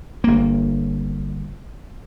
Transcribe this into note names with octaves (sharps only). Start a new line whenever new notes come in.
G1 A#3